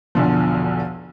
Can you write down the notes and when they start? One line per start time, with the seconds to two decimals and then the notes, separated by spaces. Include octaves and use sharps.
0.15 B1 E2 D3 F3